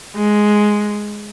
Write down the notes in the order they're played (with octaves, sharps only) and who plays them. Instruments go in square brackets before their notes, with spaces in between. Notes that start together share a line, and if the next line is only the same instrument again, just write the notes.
[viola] G#3